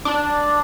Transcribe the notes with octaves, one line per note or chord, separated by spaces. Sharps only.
D4